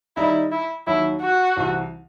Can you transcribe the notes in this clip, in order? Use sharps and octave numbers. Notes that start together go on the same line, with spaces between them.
D#3 G3 D#4 E4
E4
D#2 D#3 F#3 E4
F#4
C2 C3 E3